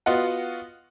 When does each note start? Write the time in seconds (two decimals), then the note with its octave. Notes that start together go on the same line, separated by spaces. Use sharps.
0.06 B3 F4 F#4 D#5 F#5